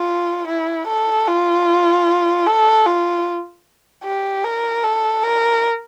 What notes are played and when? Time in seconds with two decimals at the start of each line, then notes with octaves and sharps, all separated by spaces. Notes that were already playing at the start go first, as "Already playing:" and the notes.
Already playing: F4
0.48 E4
0.88 A4
1.27 F4
2.47 A4
2.86 F4
4.04 G4
4.44 A#4
4.84 A4
5.24 A#4